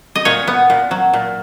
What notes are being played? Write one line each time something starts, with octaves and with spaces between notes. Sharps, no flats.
D#5
A#2 C#5
B3
A#2
F#3
A#2